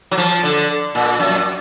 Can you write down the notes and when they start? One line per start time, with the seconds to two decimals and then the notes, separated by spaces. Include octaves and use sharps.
0.11 F#3
0.18 F3
0.43 D3
0.95 A#2
1.20 F#2